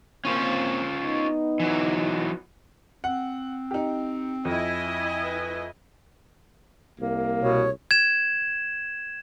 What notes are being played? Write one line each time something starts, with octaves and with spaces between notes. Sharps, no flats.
A#3 C4 C#4 F4 C5
B3 D#4
E3 F#3
C4 F#5
D#4 G4
F2 E4 D#5 G#5
B4
C2 A#3
B2 C#5
G#6 E7